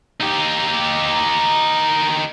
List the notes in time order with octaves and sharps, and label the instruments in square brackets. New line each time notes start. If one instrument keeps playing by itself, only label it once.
[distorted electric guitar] D#4 G4